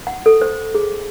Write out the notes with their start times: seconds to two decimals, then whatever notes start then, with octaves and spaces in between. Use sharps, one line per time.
0.07 F#5
0.26 A4
0.42 C5
0.74 G#4